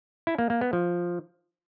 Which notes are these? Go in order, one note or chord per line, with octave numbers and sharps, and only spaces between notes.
E4
A#3
A#3
B3
F3